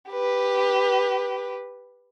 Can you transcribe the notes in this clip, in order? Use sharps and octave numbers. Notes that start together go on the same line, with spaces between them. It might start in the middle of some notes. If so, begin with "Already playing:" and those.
G4 B4